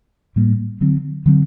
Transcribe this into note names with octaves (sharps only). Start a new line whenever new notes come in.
A2 G3 A#3
D3 F#3 C4
D3 F#3 C4